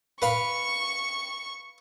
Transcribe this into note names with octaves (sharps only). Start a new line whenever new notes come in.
B4 F5 B5 C#6